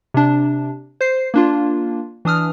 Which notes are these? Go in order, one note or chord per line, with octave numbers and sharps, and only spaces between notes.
C3 D4
C5 C7
A#3 D4 F4
E3 D4 D#6 F6